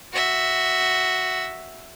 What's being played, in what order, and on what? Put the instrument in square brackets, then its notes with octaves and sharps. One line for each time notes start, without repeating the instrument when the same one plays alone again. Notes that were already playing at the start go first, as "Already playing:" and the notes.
[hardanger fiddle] F#4 E5